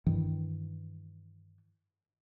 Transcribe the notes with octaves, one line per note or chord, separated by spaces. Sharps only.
G2 D#3 E3